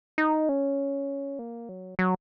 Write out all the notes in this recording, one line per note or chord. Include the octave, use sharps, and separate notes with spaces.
D#4
C#4
A#3
F#3
F#3